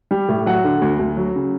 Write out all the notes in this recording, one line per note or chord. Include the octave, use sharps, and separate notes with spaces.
G3
A2
F#3 F#5
D3
D2
D2
F#3
C#3